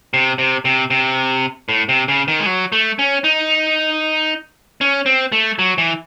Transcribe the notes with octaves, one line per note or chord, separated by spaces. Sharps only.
C3
C3
C3
C3
A2
C3
C#3
D#3
G#3
F#3
A3
C#4
D#4
C#4
C4
A3
F#3
E3